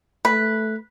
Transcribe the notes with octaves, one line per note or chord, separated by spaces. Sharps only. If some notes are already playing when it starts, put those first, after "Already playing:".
A3 B4